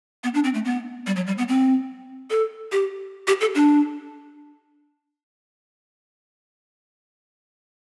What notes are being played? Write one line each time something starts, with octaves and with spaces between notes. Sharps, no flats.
B3
D4
C4
A3
B3
G3
F#3
G3
B3
C4
A4
G4
G4
A4
D4